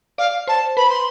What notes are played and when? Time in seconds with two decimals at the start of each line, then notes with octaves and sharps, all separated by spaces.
0.18 D5 F5
0.47 C5 A5
0.77 B4 B5
0.90 C6